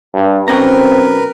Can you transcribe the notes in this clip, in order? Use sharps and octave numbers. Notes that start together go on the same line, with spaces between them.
G2
B1 C4 C#4 A#4 B4 A#5